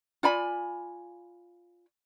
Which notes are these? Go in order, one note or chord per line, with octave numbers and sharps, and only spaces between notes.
F4 D5 G#5 B5